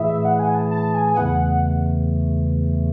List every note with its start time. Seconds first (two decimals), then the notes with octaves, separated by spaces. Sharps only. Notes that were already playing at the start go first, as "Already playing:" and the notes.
Already playing: A2 E3 A3 E4 G#4 E5
0.25 F#5
0.39 G#5
0.55 A5
0.71 A5
0.94 G#5
1.07 G#5
1.17 E2 C#3 E3 A3 F#5